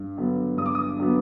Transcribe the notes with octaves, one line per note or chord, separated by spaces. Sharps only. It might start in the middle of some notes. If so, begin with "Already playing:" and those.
Already playing: G2
D3 F#3 B3
G2 D#6
D6
D#6
D3 F#3 B3